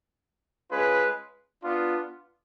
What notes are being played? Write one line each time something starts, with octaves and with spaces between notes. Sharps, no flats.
G#3 C#4 F4 G#4 B4
B3 D4 F4